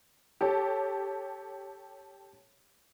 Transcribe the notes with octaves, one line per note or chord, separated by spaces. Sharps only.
G4 A4 C#5